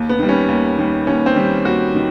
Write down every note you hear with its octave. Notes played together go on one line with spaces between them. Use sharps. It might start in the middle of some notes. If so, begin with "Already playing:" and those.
Already playing: D#2
B3
D#3 G3
C#4
D#2
D#3 G3
D#2 C#4
C4
D#3 G3
D#2 F#4
D#3